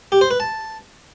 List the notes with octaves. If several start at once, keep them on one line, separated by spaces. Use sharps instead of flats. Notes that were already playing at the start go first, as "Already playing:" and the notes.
G4
C5
B4
A5